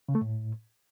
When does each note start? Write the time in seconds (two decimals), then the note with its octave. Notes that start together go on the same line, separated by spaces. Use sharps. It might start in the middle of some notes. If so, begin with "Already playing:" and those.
0.09 C#3
0.15 A3
0.21 A2